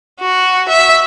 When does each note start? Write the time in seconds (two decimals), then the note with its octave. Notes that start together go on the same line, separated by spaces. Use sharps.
0.20 F#4
0.69 E5